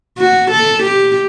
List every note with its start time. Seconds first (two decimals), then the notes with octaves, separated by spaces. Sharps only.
0.18 F#4
0.51 A4
0.83 G4